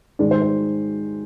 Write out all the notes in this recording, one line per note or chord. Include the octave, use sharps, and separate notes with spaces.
G#2 D#3 G#3 D5
C5
C5